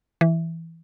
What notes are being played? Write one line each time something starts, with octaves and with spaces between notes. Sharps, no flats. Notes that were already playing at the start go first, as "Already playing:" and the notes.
E3